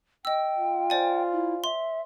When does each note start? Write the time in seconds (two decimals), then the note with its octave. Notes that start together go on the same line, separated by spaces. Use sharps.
0.25 D#5 G5 E6
0.57 F4
0.90 C5 D5 G#5
1.32 E4
1.64 E5 C6